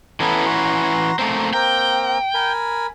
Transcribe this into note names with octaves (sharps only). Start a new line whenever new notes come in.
E3 B3 C#4 E4 A4 A#5
F#4 A#5 C6
A3 A#3 C4 A#5
A#3 C4 G5 A#5
A#4 G#5 B5